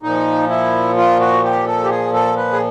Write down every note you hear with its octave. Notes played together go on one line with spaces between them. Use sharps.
A#2 F3 D#4
E4
F4
F#4
G4
A4
G4
G#4
A4
B4
G#4